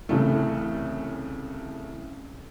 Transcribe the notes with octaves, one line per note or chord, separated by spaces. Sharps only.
C2 C#3 E3 A3